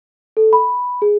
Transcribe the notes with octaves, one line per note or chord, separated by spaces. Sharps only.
A4
B5
G#4